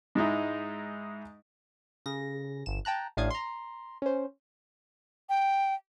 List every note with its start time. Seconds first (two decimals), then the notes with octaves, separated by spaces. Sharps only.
0.15 G#2 G#3 D#4 E4
2.06 C#3 A#6
2.66 G1 E7
2.85 G5 A5 A#5 F#6
3.17 A1 A2 D4 F5 D#6 G#6
3.30 A#5 C6
4.02 C#4 C5
5.29 G5